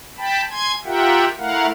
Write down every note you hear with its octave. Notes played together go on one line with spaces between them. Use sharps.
G5 A5 B5
G#5 C6 G#6
F4 G4 A#4 E5 F#5 G5
A3 E4 A#4 F5 F#5